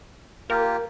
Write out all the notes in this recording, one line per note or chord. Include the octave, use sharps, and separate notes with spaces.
A#3 F4 G4 A#4